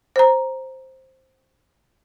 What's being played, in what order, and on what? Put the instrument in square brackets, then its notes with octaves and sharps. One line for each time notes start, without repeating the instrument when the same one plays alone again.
[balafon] C5 A#5